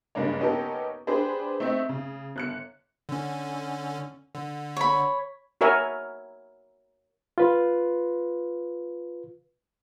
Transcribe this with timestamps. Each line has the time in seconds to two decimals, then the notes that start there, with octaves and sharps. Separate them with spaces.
0.15 F#1 G2 C#3 G#3 A#3 C#5
0.40 B3 C#4 D#4 G4 A4 A#4
1.07 D4 G4 G#4 B4 C5
1.60 A3 C4 D#4 E5
1.89 C#3
2.36 G1 F#6 C#7
3.09 D3 C#4
4.35 D3
4.77 C#5 B5
5.61 F#4 A#4 C#5 E5 G#5
7.38 F4 B4